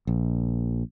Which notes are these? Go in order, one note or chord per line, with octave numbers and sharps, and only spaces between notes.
A#1